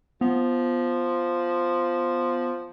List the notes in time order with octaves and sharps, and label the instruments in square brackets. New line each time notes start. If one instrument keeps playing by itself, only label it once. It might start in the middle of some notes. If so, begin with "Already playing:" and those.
[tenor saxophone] F3 [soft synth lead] B3